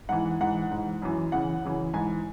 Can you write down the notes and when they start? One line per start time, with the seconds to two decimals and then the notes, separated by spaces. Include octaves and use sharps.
0.09 G#2 E3 F#5
0.41 G#2 E3 F#5
0.71 G#2 E3
1.02 F#2 E3
1.32 E2 C#3 E3 F#5
1.63 F#2 C#3 E3
1.93 G#2 E3 G#5